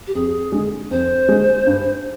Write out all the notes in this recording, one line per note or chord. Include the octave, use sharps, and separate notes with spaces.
G4
F2 G#4
D3 G#3
F2 C5
D3 G#3
G2